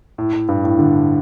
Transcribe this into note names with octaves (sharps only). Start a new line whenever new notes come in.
A2
A2
G2
A2
D3